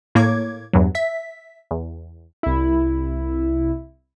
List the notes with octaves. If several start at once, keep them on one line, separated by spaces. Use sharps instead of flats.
A2 A#3 C#5 D6 G#6
E2 G2 F#3
E5 B6
E2
C2 E4